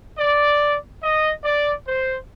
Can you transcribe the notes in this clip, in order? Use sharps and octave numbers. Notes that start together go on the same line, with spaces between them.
D5
D#5
D5
C5